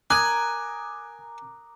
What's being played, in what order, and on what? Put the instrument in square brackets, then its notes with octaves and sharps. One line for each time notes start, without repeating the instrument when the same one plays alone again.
[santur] A#4 [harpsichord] G#5 [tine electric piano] A#5 G#6 [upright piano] D6 D#6 F#6